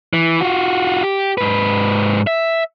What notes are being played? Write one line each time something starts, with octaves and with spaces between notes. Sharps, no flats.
E3
F4 F#4
G4
G#2 B4
E5